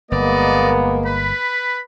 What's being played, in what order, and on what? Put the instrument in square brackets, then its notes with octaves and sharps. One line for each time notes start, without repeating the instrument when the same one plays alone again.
[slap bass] G1 [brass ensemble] G#3 A#3 [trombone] B3 [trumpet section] D5 D#5
[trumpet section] B4 B5